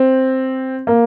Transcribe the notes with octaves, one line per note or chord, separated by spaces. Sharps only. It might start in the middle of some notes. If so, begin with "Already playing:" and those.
Already playing: C4
A#3